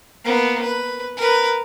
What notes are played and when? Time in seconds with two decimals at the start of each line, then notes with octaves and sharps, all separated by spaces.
0.25 A#3 B3
0.62 B4
1.17 A#4 B4